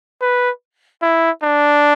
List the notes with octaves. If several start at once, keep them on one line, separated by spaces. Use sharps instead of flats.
B4
E4
D4